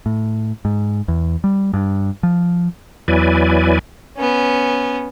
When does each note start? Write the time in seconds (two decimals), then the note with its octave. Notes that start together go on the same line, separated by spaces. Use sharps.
0.06 A2
0.65 G#2
1.08 E2
1.44 G3
1.73 G2
2.23 F3
3.08 E2 F#3 E4 B4 D5 G#5
4.17 B3 C#4